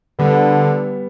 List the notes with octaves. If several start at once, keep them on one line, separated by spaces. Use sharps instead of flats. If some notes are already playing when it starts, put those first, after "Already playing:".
D3 G3 B3